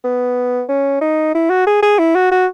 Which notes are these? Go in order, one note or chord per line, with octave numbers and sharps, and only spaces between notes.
B3
C#4
D#4
E4
F#4
G#4
G#4
E4
F#4
F#4